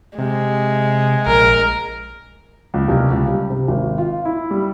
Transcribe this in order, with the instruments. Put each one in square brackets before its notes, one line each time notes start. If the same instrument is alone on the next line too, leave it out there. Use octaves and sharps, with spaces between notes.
[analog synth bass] C3 [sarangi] G#3
[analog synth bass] A#1 [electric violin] A#4
[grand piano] C#2
C2
C#2
G3
C3
G#1
F4
E4
G3